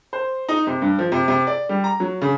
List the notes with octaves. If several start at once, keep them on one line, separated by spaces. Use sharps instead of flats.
C5
D#4
C3
G2
F3
C3
C3
D5
G3
A#5
F#3
C#3